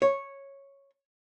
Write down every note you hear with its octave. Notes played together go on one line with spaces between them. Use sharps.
C#5